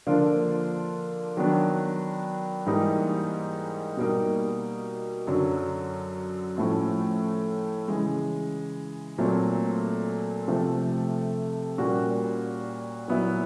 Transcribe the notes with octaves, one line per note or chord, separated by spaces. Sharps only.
D3 F3 A#3 D4 F4
D#3 F#3 B3 D4
G#2 E3 G3 A#3 D#4
B2 G3 A#3 D#4
F#2 D3 F#3
A2 F3 A3 C#4
C#3 E3 G#3
A#2 F#3 A3 C4
C3 F3 A3
A#2 G3 A#3 C#4 F#4
A#2 F#3 B3 E4